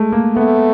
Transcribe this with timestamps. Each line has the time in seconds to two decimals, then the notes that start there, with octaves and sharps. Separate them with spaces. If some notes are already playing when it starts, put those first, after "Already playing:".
Already playing: G#3 A3
0.12 A#3
0.36 A3 B3